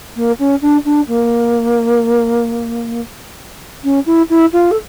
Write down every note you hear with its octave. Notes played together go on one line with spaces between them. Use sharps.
A#3
C#4
D4
D4
A#3
C#4
E4
E4
F4
A4